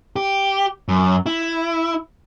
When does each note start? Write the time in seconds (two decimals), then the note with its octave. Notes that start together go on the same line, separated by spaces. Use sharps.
0.16 G4
0.88 F#2
1.26 E4